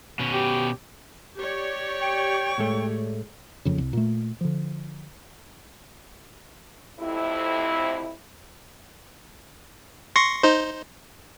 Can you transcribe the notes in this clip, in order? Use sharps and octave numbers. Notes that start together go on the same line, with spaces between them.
B2 C#4
G4
G4 C#5 D5
G5 C#6
A2 G#3 A3
F#1 F2 C#3
C2
A#2 A3
D3 F3
F2 A2 C3 E4
C6 C#6 A#6
D#4 C5